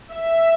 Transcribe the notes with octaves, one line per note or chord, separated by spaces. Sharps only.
E5